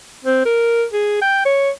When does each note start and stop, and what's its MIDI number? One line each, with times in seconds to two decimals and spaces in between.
0.24 0.42 60
0.45 0.85 70
0.93 1.21 68
1.22 1.42 79
1.45 1.70 73